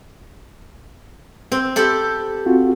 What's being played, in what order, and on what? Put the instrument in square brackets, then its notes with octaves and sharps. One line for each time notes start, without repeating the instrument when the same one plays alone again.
[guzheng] C4
G4 A4 B5
[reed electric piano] C4 F4 F#4